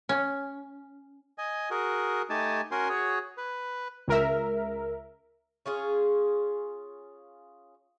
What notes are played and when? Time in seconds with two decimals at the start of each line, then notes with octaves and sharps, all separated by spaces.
0.09 C#4
1.38 D#5 G#5
1.70 F#4 G#4 A#4
2.30 A3 D#4 G4 G#5 A5
2.71 C#4 F#4 A#4 G#5 C6
2.89 F#4 G#4 C#5
3.38 B4
4.08 C#2 A#4 E5
5.66 C#4 F4 G#4